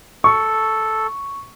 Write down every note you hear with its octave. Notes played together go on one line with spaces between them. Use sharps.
A4 C#6